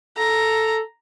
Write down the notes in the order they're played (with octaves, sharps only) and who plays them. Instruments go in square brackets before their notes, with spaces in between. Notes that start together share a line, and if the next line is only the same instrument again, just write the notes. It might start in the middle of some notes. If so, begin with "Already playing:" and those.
[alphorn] A4 [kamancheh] A#5